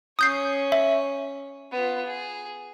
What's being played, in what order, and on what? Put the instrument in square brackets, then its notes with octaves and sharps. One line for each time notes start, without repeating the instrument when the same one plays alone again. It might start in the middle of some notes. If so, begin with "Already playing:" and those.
[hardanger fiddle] C#4 C#5 [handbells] D#6 G6 C7
[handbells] E5
[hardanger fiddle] B3 F4
G#4